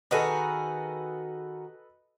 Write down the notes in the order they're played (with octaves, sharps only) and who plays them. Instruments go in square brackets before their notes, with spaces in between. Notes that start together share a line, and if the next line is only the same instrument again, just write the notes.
[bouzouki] D#3 F#4 G#4 [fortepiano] A4 B4 D#5